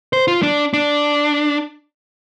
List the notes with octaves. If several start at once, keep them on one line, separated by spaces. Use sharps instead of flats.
C5
F4
D4
D4